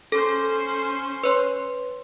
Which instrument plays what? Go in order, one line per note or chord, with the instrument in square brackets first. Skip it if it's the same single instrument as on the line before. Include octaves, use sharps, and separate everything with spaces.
[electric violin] C#4 C5 [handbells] A4
[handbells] B4 C#5 C6